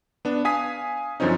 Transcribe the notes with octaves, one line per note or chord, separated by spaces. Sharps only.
B3 D4
F5 G#5 D#6 B6
F#2 D3 F3 C4 C#4 D#4